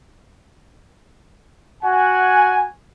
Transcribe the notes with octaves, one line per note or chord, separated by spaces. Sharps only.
F#4 F#5 G#5